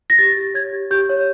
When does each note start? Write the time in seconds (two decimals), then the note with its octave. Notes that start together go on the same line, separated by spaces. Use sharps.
0.10 A#6
0.18 G4 A6
0.37 G4
0.54 C#5 G#6
0.73 G4
0.91 G4 G6
1.09 C#5